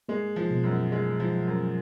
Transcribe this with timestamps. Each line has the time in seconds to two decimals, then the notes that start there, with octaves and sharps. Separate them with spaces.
0.09 G#3 A#3
0.36 F3
0.50 B2
0.64 F#2
0.92 G#3
1.20 F3
1.48 F#2